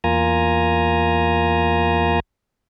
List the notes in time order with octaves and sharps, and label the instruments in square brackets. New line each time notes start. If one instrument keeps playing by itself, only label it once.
[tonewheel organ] E2 A#3 F4 G#5 A#5